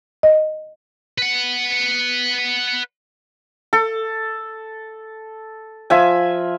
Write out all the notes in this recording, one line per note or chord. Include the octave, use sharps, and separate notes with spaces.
D#5
B4 F#5
A4
F3 E5 G#5